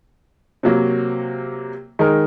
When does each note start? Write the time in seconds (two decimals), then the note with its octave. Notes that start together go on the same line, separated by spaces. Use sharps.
0.63 C3 F#3 A#3
1.99 D#3 G#3 D#4 A#4